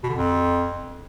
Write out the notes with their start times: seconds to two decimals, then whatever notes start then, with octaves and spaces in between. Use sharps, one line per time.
0.03 B2
0.09 D3
0.15 F2